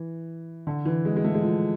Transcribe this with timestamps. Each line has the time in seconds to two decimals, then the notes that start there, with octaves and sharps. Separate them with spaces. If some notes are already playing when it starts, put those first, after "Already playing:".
Already playing: E3
0.67 D3
0.85 E3
1.05 G#3
1.16 G#3
1.24 A3
1.35 G#3
1.42 F3